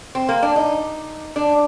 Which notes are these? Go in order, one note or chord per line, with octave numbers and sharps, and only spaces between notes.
C4
A#3
D4
D#4
D4